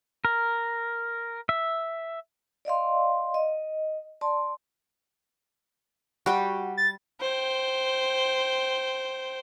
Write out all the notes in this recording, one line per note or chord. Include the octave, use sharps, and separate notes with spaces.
A#4
E5
D5 D#5 F5 C6
D#5
D5 A5 C6
G3 F#4 G5
A6
C5 G5